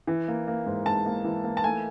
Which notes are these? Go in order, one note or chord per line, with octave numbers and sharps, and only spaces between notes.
E3
A#3
A#3
G#2
G#2 A5
A#3
E3
A#3
A5
A3 G#5